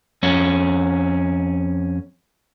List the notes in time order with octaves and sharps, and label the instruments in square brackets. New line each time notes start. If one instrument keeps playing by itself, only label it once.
[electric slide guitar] F2 C#4